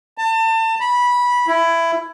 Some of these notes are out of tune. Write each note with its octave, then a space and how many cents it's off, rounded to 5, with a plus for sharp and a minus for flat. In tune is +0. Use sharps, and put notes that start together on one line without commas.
A5 +30
B5 -15
E4 +15